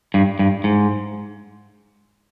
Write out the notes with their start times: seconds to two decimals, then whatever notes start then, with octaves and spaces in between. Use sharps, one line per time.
0.14 G2
0.39 G2
0.64 G#2